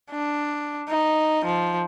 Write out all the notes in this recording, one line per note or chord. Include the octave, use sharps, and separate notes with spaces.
D4
D#4
F3